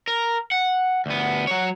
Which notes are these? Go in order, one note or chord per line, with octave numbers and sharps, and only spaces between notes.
A#4
F#5
D2 B3
F#3 C#5